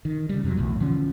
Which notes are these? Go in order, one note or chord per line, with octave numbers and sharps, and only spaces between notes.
D#3
C#3 G3
F2 C3 F3 F#3
B1 E2 A2
D3 E3 F3 C#4